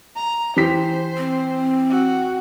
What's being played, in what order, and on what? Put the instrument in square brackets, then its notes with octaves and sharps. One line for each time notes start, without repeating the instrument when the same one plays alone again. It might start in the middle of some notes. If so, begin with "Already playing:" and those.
[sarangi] A#5
[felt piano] E3 G4 B6 [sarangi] C5
[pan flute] C4
[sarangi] F#4